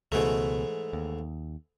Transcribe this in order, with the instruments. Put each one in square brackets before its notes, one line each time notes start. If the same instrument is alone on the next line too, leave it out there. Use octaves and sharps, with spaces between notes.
[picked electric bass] C#2 B2 [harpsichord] G#2 E3 A3
[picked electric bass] D#2